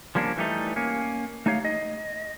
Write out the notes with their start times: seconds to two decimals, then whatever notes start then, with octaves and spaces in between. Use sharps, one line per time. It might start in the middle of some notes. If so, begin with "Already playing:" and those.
0.15 F3 G3 A#3 C#4 D4
0.37 E3 G3 A3 D#4
0.76 A#3 C#4
1.46 A3 D#4 G4 C#5 F5
1.65 D#5